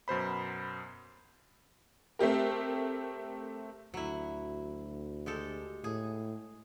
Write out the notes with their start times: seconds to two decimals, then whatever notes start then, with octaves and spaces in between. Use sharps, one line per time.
0.08 F#2 B2 C5 B5
2.19 A3 C4 G4 A#4
3.94 D2 F#3 E4
5.26 G#3 G4 A4
5.84 A2 G#4